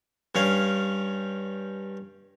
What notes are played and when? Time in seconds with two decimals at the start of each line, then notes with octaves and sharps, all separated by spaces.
0.35 G2 C#4 F5